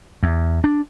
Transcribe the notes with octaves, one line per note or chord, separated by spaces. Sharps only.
E2
D4